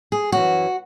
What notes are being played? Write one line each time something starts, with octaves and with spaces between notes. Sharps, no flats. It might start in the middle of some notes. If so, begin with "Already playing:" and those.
G#4
F#2 E3 F#4